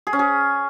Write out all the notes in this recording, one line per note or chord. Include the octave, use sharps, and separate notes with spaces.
G#4
C#4
G#4